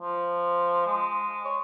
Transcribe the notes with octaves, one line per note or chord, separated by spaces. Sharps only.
F3
G#3
C#5